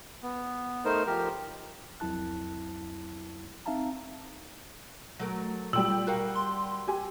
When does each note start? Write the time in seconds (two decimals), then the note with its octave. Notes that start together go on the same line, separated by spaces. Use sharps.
0.23 B3
0.85 A3 D#4 A#4 C5
1.07 F3 G4 A#4
2.00 C2 F2 F#3 E4 A5 F#6
3.66 C4 D#4 E5 F5 A5 A#5
5.19 F#3 A3 A#4
5.73 A#2 G3 G5 E6 F#7
6.07 F#4 A#4 F5
6.36 C6
6.87 G4 G#5